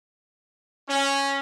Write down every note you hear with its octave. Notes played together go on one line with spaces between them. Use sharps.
C#4